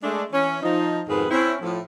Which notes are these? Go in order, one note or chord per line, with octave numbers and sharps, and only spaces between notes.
G#3 A3 D4
E3 C#4
F3 D#4
F2 G#2 B2 D#3 G#4 B4
C4 C#4 E4
A2 F3